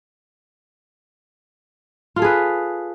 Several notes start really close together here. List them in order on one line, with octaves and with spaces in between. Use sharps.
F4 A4 G#4 B4